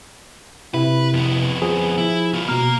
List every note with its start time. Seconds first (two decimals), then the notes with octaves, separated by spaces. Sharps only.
0.74 C3 E4 B4
1.14 F2 B3
1.62 F3 G#4
1.98 E4
2.33 B3 F4
2.49 B2 A#3 A#5 F6